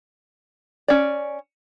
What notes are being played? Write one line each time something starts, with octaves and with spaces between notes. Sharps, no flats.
C#4 D5